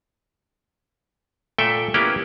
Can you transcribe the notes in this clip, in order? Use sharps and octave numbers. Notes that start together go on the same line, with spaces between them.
A#2 A3 A4 E5 G5
A#3 B3 C#4 E4 G4 B4